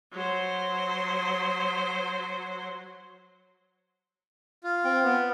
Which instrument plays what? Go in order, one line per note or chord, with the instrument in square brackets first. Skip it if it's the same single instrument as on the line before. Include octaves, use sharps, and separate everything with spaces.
[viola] F#3 C5
[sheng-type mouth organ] F4
[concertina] C4 G5
B3